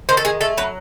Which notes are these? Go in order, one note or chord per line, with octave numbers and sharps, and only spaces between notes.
D#3 C5
A4
G#3 G#4
A3 A4
F#3 B4